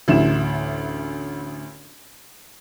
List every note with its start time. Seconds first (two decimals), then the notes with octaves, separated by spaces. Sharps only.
0.08 A1 D2 E4 E7